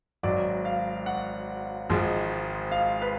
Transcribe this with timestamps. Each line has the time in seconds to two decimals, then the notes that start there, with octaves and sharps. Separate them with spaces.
0.23 G#1 G#2 F#3 D5
0.65 F5
1.06 F#5
1.89 G#1 G#2 F3 G#3
2.72 F5
3.02 B4